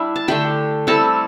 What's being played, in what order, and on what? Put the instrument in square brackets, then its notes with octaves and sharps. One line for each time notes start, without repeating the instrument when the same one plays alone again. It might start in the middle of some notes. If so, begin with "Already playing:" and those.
Already playing: [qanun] G3 D4 E4 E5
A5
D3 A3 D4 G4 G5
G3 C4 E4 A4 A5